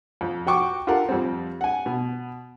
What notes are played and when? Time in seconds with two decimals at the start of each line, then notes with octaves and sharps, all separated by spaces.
0.21 F2
0.47 F#4 G5 C#6 D6
0.87 F4 G4 A4 A#4 F#5
1.09 F2 G3 C4
1.61 F#5 G#5
1.86 B2